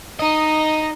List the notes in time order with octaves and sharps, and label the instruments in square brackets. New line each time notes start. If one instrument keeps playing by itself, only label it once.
[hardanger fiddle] D#4 [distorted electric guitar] D#5